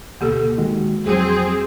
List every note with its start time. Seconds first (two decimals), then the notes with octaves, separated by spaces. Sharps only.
0.21 D2 B2 A#3 G4 A4
0.58 D#3 G#3 F#4
1.06 F2 F#3 C4 G#4